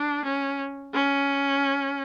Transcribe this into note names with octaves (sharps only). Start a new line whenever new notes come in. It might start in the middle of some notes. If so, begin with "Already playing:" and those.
Already playing: D4
C#4
C#4